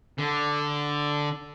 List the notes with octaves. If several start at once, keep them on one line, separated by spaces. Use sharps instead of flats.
D3